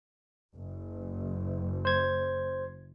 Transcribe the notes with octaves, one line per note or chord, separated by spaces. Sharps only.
F#1
C5 G#6